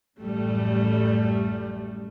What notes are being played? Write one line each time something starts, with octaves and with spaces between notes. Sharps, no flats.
A1 F#2 G3 A3